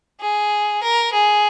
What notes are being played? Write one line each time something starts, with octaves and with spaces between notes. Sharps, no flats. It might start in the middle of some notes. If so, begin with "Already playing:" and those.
G#4
A#4
G#4